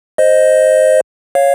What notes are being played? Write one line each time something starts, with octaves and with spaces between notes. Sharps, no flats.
C5 D#5
C#5 F5